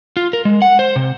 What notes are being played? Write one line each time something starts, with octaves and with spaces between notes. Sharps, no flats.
F4
A#4
G#3
F#5
C5
C3